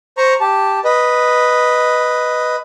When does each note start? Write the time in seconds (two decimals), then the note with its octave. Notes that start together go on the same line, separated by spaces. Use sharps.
0.17 C5 A#5 C#6
0.40 G4 A5
0.84 B4 D#5